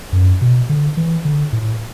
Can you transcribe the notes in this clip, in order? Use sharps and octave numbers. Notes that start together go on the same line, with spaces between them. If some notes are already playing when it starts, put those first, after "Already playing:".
F#2
B2
D3
E3
D3
A2